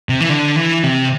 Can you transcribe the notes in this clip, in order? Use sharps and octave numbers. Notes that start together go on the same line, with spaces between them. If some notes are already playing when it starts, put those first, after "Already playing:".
C3
E3
D3
E3
C3